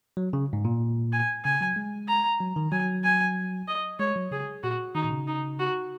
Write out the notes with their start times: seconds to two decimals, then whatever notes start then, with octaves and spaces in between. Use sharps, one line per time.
0.17 F#3
0.33 C#3
0.53 G#2
0.65 A#2
1.12 G#5
1.45 C#3 G#5
1.61 F#3
1.76 G#3
2.08 A#5
2.41 F#3
2.56 D#3
2.72 F#3 G#5
3.04 G#5
3.68 D#5
3.99 G#3 C#5
4.15 F#3
4.31 C#3 G#4
4.63 A#2 F#4
4.95 D#3 D#4
5.04 A#2
5.11 C#3
5.27 D#4
5.59 F#4